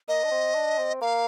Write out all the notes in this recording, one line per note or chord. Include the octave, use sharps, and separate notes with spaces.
A#3 D#5
D4
C4
D4
C4
A#3 F5